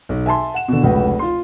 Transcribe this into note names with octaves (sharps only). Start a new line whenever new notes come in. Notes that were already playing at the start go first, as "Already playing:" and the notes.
B1
E5 G#5 A5 C6
F#5 E7
B2 D3
F1 C#2 F#4 B4
F4 C6